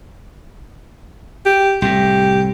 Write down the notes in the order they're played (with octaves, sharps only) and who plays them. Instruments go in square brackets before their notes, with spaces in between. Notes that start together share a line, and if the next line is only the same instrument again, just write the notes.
[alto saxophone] G4
[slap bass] C2 A2 [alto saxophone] G4